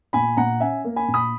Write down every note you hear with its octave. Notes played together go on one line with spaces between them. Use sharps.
A#2 G#5 B5
A#2 F#5 A#5
C#4 E5 G#5
A#3
G#5 B5
A#2
B5 D#6